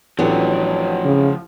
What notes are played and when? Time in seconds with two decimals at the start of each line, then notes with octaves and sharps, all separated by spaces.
0.19 A1 F3 F#3 B3 D4 E4 G4 A4
1.05 C#3